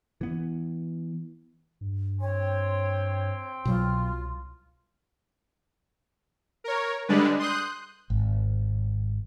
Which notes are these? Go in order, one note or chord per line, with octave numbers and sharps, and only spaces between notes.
E3 B3
G2
C4 C#5 G5 C6
C2 B2 F#3 F4
A#4 C#5
D3 G3 G#3 D4 B4
C6 D#6 F#6 G6
G#1